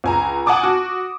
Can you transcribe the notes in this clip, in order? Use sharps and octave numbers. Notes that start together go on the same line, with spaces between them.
C#2 G#5 A#5
F#5 G#5 A5 D6 D#6
F#4